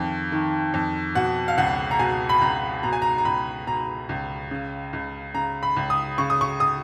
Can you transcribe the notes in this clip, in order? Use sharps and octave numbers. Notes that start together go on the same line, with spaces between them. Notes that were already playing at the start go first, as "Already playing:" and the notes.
Already playing: F2 D#3
D#3
F2
B2 F#5
F5
C#2 F#5
A#5
B2 G#5
B5
C#2 A#5
B2 A#5
G#5
A#5
A#5
C#2 B5
B2 A#5
C#2
C#3
C#2
C#3 A#5
B5
C#2
D#6
C#3 C#6
D#6
C#6
D#6